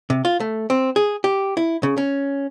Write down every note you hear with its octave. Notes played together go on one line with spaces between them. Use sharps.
C3
F4
A3
C4
G#4
G4
E4
C#3
C#4